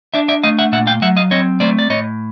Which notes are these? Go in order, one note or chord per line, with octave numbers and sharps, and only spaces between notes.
D4 D5 E5
D5 E5
A3 D#5 F5
E5 F#5
A#2 E5 F#5
F5 G5
F#3 E5 F#5
D#5 F5
C4 C#5 D#5
A3 C5 D5
D5
A2 C#5 D#5